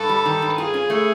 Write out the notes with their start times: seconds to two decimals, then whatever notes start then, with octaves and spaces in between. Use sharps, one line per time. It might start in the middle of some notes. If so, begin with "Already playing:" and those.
Already playing: G2 A4
0.09 G3
0.26 D#3
0.42 G2
0.58 F4 G#4
0.74 C#4
0.90 A3